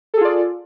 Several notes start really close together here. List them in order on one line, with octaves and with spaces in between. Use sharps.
A4 G#4 F4 D5